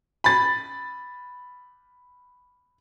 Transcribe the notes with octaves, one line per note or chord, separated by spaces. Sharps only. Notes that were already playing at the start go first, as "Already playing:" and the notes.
B5 A6